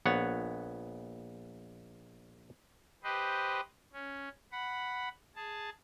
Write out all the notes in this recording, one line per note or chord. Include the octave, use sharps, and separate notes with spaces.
A#1 B3 C#5 F#5
G4 B4 C5 D#5
C#4
F#5 B5
G#4 A5